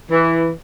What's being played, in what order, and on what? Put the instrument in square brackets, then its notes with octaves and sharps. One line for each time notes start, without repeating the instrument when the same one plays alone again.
[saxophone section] E3